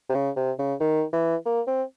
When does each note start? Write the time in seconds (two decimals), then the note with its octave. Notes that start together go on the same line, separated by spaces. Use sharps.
0.10 C3
0.15 C#3
0.37 C3
0.59 C#3
0.80 D#3
1.13 E3
1.46 A#3
1.67 C4